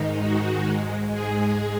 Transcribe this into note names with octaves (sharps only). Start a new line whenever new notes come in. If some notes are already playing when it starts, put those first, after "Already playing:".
Already playing: G#2 D#3 G#3 D#4
F#4
G#2 G#3
G#4